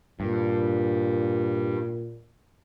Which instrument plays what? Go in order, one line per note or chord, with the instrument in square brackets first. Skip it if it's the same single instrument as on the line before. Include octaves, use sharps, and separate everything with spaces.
[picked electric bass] G2 [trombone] A#2